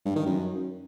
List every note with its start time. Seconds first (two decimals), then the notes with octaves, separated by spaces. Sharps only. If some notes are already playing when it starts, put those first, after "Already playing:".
0.05 G2
0.16 D#3
0.26 F#2